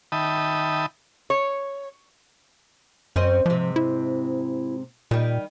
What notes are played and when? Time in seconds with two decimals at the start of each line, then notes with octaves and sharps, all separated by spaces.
0.12 D#3 E5 G5 A5 B5 D#6
1.30 C#5
3.16 F#2 C4 C#4 D#5
3.46 G#2 C3 F3
3.76 E4
5.11 A#2 D#3 G3